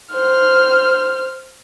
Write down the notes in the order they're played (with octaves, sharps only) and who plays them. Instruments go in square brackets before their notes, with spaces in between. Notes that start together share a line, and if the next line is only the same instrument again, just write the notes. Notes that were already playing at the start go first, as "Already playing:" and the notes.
[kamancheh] C5 F6